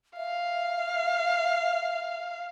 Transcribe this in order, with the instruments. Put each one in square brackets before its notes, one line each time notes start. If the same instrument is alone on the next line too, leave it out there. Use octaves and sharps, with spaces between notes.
[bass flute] E5 [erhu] F5